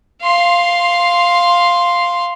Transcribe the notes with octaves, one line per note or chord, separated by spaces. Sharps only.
F5 C6